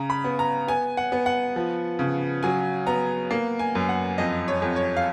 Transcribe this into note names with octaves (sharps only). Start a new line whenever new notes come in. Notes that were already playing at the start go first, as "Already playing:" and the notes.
Already playing: C#3 A#5
B5
B3
A#5
B3 G#5
F#5
B3
F#5
F3
C#3
F#3 G#5
B3 A#5
A#3
G#5
F#2
F#5
F2 D#5
C#5
F2
C#5
F5